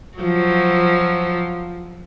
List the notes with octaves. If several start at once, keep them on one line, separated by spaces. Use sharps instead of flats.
F3 F#3